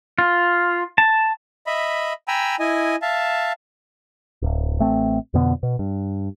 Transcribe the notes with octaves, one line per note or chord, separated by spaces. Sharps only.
F4
A5
D#5 E5 B5
G5 G#5 A#5 B5 E6
E4 D#5 G#5
E5 F5 A5
D1
A1 A3 C4
F2 B2 D3 B3
B2
G2